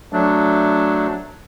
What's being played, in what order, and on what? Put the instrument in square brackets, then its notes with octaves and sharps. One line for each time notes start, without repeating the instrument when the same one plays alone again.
[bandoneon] F#3 A3 D4